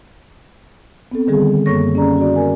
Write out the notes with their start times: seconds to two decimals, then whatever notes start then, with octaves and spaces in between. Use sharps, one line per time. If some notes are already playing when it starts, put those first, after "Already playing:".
1.11 B3 C4 A4
1.28 D3 D#3 G3 C4 G#4
1.66 F#2 A#3 A4 C#5 C#6 A#6
1.95 C#4 G4 G#4 D5 A#5
2.18 F#4 D5
2.36 A#4 D5 G#5